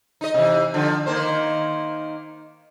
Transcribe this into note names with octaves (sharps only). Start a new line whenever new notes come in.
D#4 D#5
C3 E3
D3 F3
D#3 A#3 C5